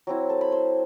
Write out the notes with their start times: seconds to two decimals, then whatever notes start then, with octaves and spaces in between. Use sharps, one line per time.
0.07 F#3 C4 E4
0.29 A4 A5
0.41 B5
0.51 C5 C6